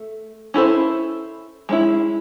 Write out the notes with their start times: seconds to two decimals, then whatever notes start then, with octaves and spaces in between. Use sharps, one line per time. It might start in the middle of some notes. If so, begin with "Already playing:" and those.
Already playing: A3
0.54 C#4 E4 A4 C5
1.69 G#3 C#4 E4